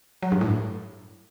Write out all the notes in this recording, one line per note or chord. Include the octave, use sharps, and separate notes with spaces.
F#3
G2
A2